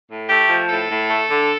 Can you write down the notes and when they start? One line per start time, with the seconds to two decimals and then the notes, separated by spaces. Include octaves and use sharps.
0.09 A2
0.29 A3 G4
0.49 F3
0.69 A2 A4
0.89 A2
1.09 A3
1.30 D3